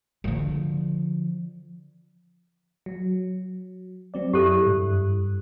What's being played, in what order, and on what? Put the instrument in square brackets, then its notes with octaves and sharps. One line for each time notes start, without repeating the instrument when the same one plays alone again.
[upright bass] D3 F3
[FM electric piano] F#3
F#3 C4 D5
[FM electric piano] F#2 E4 F#6 [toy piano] G4 A4
[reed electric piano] G2